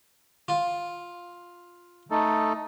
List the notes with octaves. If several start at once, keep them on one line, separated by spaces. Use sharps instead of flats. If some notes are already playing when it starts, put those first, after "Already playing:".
F4
A3 D#4 A4